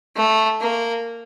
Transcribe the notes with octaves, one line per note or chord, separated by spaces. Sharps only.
A3
A#3